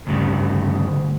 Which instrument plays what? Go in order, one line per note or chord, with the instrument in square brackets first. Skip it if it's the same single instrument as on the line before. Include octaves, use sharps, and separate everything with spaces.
[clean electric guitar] D2 G2 C#3